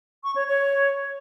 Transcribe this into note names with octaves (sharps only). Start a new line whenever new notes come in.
C#6
C#5
C#5